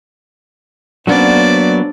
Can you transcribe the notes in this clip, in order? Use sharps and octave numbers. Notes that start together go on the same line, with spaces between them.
F#3 A#3 B3 C#4 D4 C5 D5